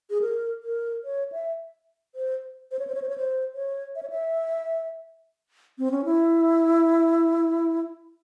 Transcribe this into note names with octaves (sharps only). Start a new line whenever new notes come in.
G#4
A#4
A#4
C#5
E5
C5
C5
C#5
C5
C#5
C5
C#5
C5
C#5
E5
C#5
E5
C4
C#4
E4